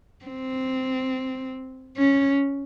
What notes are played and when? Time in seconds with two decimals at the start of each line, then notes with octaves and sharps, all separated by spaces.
0.25 C4
1.97 C#4